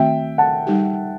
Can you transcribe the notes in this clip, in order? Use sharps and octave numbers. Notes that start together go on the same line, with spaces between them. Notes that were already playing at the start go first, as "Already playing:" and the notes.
Already playing: D#3 A3 C4 F#4 E5 G5
F#5 A5
G3 D#4 G4